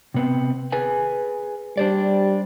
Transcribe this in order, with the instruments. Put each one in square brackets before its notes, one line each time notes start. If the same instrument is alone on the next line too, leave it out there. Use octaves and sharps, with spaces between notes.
[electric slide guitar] C3 B3 C4
G#4 B4 G#5
[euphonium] G3 [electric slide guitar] D4 C5 D5